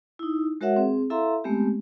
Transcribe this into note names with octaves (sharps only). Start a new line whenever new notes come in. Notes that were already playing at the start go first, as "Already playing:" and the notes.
D#4 E4
G#3 F#4 A#4 C#5 E5 F#5
C4 G#4
E4 A4 E5 F5 A#5 C6
G#3 A3 B3 C4 G4